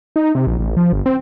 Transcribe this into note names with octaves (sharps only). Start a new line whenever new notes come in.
D#4
C3
A#1
A1
F3
G1
C4